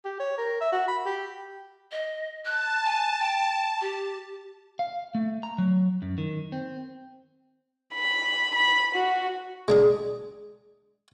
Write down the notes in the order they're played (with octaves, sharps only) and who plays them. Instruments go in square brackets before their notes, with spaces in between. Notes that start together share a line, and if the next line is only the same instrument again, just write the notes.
[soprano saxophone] G4
C#5
A#4
E5
F#4
B5
G4
[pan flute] D#5
[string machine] A5 [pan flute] F#6
[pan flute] G#5
G5
G4
[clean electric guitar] F5
A3
A#5
F#3
F#2
D#3
C4
[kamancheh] B5
B5
F#4
[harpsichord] G#3 D4 G#4